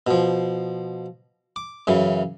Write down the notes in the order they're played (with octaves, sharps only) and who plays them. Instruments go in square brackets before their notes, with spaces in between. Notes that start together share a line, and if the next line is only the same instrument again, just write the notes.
[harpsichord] B2 F3
D6
F#2 C#3 E3